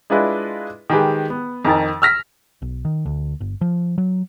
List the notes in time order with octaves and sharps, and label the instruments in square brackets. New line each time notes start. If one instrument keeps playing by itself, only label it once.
[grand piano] G#3 D4 E4 F4 B4 D#5
D#3 G#3 G4 G#4 B4
B3
F2 D#3 D#4 A#4 G#5 A6
E6 F6 A#6 B6
[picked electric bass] B1
D#3
D2
G1
F3
F#3